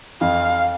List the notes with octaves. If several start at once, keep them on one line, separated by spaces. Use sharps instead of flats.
F2 F5